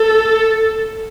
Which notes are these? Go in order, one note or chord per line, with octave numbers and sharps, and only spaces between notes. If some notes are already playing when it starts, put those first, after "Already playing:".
Already playing: A4